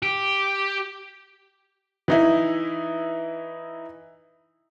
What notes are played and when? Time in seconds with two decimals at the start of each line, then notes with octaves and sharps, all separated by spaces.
0.02 G4
2.08 E3 D#4 E4